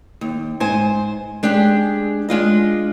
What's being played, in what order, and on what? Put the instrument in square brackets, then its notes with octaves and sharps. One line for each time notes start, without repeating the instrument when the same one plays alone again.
[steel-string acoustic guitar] D#2
G#2 C5 G#5
G#3 D4 G4 G#4
G#3 D4 F4 D#5